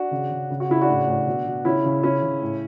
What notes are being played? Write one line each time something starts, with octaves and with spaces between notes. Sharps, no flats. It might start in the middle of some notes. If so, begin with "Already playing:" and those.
Already playing: D4 F#4
C#3
C#3
C#3
F#4
C#3 E4
D4 F#4
A2
A2
B2
B2
C#3 C#4 E4
C#3
C#3 C#4 E4
C#3
A2